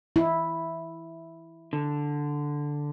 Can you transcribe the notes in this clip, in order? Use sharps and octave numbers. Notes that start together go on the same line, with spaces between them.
E4
D3